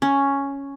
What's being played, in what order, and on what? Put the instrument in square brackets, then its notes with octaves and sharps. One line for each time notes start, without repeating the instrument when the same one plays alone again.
[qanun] C#4